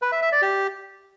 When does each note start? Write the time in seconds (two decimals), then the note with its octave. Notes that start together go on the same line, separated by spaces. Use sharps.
0.02 B4
0.12 E5
0.22 E5
0.32 D5
0.42 G4